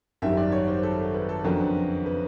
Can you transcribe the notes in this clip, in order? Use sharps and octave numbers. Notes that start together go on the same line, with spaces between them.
G#1 F#2 D#3 G3 E5
D5
C#5
C5
A4
B4
A4
F2 C#3 F#3 B3 D4 A#4
B4